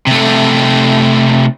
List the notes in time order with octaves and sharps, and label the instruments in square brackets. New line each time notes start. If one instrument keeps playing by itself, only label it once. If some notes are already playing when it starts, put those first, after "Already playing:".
[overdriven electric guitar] C3 A3